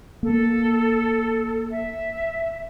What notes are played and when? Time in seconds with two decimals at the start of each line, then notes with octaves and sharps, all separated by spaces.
0.23 A#3 A4
1.71 E5